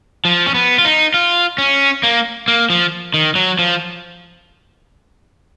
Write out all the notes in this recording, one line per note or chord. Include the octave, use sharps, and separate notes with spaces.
F3
C#4
B3
F4
D#4
F4
C#4
A#3
A#3
F3
D#3
F#3
F3